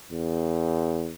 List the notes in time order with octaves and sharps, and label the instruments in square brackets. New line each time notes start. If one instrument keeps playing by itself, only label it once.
[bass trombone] E2